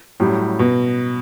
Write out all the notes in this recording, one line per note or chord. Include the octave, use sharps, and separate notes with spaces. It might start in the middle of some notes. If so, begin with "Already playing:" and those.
A2 F#3 G3
B2